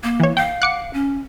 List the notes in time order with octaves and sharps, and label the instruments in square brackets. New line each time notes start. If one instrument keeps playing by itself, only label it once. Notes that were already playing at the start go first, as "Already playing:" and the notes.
[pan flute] A#3
[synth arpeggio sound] E3 C#5
[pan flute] F5 [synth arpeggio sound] G5
[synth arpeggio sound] F#5 D6 C#7
[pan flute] C#4